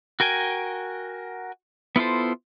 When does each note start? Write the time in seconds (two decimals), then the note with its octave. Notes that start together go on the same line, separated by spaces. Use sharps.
0.20 F#4 A#4 G5 G#5
1.96 B3 E4 F4 A4 C5